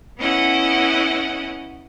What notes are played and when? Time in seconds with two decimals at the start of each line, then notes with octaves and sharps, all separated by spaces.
0.19 B3 C#4 E4 D#5 F#5